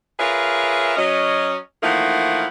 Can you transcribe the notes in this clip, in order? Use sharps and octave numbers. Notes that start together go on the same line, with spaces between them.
F4 G#4 A#4 B4 C#5 E5
F#3 C#4 D#5
E3 F3 A3 A#3 D#4 F#5